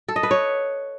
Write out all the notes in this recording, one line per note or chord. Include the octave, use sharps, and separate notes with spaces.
A4
D#5
B4
C#5